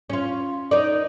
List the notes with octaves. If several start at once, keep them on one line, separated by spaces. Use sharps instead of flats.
C#4 F4
D#4 A#4 D5